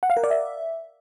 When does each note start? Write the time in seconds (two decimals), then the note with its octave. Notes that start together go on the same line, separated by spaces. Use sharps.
0.03 F#5
0.10 F5
0.17 A#4
0.24 D5
0.30 E5